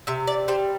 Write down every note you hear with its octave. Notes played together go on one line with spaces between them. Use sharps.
C3 E5
D5
G3 C5